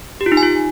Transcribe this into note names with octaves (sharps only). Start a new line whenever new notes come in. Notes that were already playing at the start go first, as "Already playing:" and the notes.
G4
F4
D#4
G#5
F4